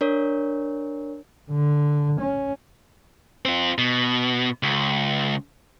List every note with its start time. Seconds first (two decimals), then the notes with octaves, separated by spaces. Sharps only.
0.01 D4 A#4 C#5
1.51 D3
2.20 C#4
3.45 C4 F4
3.78 B2
4.63 C#2